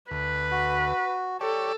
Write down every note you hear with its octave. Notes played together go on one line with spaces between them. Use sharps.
D2 B4
F#4
G4 A4 C#5 D5